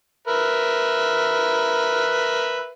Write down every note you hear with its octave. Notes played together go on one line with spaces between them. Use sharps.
A#4 B4 E5